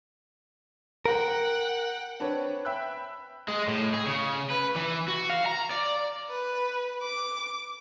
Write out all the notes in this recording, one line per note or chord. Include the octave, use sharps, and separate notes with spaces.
A#4 F#5 G5
C4 D4 B4 C#5
E5 G5 B5 E6 F#6
G#3
A2
G#4
C#3
B4
E3
F#4
F5
A#5
D5
B4
D6